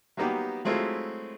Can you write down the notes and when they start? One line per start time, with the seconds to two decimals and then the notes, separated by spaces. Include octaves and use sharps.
0.17 F#3 G3 A#3 B3 D#4 G4
0.65 F#3 G#3 A3 C4 E4 F4